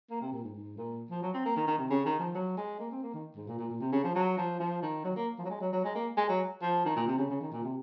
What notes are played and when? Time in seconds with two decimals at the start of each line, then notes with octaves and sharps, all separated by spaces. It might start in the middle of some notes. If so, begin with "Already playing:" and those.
0.10 A#3
0.21 C3
0.32 A#2
0.44 G#2
0.55 G#2
0.77 A#2
1.11 F3
1.22 F#3
1.34 C4
1.45 A#3
1.56 D#3
1.67 D#3
1.78 C3
1.90 C#3
2.05 D#3
2.19 F3
2.35 F#3
2.57 G#3
2.79 A#3
2.91 C4
3.02 A#3
3.14 D#3
3.36 G#2
3.47 A#2
3.58 A#2
3.70 A#2
3.81 C3
3.92 C#3
4.04 F3
4.15 F#3
4.37 F3
4.60 F3
4.82 D#3
5.04 F#3
5.16 A#3
5.39 F3
5.44 F#3
5.50 G#3
5.60 F#3
5.72 F#3
5.84 G#3
5.95 A#3
6.17 G#3
6.29 F#3
6.62 F3
6.85 D#3
6.96 A#2
7.07 C3
7.18 C#3
7.30 C#3
7.41 D#3
7.52 A#2
7.63 C3